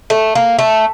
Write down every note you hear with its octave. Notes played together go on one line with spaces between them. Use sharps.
A3
A#3
A3